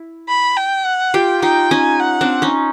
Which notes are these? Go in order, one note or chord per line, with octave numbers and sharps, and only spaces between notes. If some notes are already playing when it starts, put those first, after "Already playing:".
Already playing: E4
B5
G5
F#5
F4 G4 G5
D#4 F4 G5
C#4 D#4 G#5
F#5
C4 D4
C#4 D#4